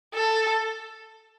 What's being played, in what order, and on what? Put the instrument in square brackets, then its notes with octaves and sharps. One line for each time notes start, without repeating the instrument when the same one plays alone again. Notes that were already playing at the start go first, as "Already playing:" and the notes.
[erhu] A4